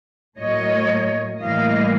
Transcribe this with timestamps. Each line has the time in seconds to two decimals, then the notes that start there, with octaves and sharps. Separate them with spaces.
0.38 A2 F#3 A#3 C#5 D#5
1.40 A2 E3 G3 A#3 D#5 F5